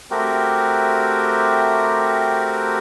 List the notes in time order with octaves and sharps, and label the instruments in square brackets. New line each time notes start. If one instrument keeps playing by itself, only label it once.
[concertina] A3 C4 F#4 G4 A#4